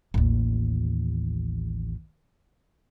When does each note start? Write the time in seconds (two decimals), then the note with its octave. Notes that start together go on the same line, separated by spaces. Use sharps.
0.14 A1 D#2